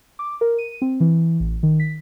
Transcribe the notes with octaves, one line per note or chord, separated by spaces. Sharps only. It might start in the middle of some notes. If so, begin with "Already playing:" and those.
D6
A#4
D#7
C4
E3
A1
D#3
B6